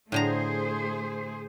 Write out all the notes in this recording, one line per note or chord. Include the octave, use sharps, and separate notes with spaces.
A2 D3 A3 G#4 C5 A#5